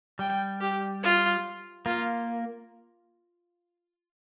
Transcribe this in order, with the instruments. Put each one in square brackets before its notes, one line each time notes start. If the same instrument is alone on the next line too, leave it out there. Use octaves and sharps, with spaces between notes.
[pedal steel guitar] G3 [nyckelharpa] G5
[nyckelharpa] G4
F4
[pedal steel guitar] A#3 [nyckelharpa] F4